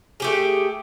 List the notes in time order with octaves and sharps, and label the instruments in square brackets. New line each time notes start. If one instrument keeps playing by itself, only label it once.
[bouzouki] A3 G4 G#4